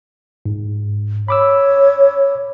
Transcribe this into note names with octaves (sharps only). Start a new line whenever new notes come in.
G#2
C#5 B5 D6 E6